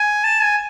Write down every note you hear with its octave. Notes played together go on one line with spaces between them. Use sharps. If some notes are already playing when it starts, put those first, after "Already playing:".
Already playing: G#5
A5
G#5